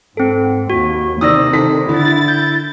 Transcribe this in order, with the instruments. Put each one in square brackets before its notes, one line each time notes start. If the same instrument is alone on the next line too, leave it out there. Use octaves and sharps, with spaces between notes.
[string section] G#2 [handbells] C4 A4
[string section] D#2 [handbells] F#4
[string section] C3 [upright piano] D#3 D5 E6 [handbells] D#6 A#6
[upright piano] D#3 A4 B6
[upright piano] D3 [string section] E4 A6
[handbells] G6